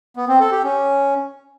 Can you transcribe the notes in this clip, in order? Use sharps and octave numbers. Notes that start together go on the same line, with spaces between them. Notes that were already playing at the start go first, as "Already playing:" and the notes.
B3
C4
A4
G4
C#4